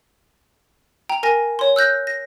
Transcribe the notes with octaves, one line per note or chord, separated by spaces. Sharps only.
G5 A#5
A#4 G#5 A#6
C#5 C6
E6 F#6 G6 A#6
A#6